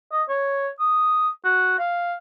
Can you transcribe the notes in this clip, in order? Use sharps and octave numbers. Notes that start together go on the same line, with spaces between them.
D#5
C#5
D#6
F#4
F5